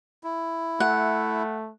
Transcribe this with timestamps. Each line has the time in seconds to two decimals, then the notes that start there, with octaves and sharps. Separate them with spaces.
0.24 E4
0.80 A3 F#5